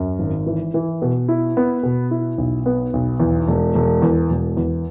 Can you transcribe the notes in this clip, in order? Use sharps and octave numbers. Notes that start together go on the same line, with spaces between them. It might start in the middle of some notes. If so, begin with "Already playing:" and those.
Already playing: F#2
G#1
E3
E3
B2
E4
B3
B2
E4
B1
B3
B1
E2
E1
E1
E2
E1
E2